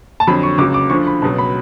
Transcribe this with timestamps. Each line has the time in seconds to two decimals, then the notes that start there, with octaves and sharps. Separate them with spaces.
0.20 A5
0.27 F2 D3 F#3 B5
0.43 C#6
0.58 C#2 C#3 F#3 D6
0.74 D6
0.90 D2 D3 F3 C#6
1.07 B5
1.22 C#2 B2 F#3 A5
1.38 B5